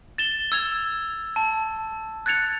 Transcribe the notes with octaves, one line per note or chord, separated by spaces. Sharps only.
A6 E7 G7
E6 G#6 F7
A5
F#6 G#6 A6 C#7 F7